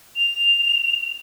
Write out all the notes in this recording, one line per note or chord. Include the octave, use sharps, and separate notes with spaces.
F7